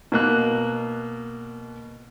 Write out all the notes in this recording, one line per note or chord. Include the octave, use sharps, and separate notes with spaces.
B2 A#3 F#6